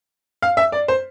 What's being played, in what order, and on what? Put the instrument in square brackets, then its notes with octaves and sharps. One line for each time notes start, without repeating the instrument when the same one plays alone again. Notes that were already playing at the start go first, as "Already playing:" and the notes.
[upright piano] F5
E5
D5
C5